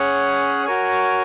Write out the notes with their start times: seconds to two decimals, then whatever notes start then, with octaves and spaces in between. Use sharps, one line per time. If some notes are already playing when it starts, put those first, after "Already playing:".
Already playing: C#4 G#4 C#5 F#5
0.65 F#4 A#4 C#5 G#5